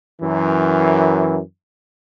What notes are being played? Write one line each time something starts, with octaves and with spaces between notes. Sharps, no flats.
F#2 E3